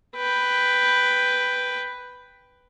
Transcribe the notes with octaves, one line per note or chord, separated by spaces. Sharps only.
B4 G5